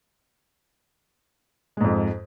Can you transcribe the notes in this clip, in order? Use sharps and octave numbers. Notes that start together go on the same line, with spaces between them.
F2 G#2 G#3